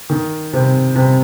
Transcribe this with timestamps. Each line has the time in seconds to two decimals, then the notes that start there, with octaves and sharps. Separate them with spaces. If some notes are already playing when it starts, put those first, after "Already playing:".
0.10 D#3
0.53 C3
0.96 C3